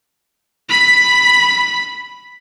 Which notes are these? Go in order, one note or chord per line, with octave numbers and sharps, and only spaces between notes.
B5 B6